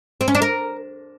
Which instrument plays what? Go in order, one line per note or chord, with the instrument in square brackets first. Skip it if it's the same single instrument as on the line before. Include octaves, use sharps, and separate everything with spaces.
[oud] C4
C#4
D4
A#4